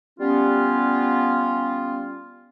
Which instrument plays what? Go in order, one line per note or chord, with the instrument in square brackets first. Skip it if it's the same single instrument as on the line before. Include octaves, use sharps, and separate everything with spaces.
[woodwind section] G3 B3 C#4 F4